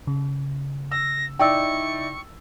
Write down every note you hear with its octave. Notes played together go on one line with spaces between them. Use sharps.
C#3
E6 A#6
D#4 E4 D5 G5 C#6 E6